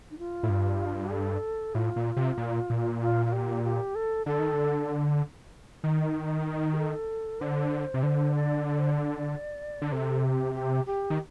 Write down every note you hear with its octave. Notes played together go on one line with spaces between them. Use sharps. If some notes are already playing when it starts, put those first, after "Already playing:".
D#4
F4
A2
G2
A4
A2 F4
A#2
C3
A#2
A#2
F4
F4
G4
G4
A4
D3 A4
D#3
D3
D#3
G4
A4
D3 C5
C3
D3 C5
D5
D5
C5
D5
D3
C3 A4
G4
G4
G4
D#3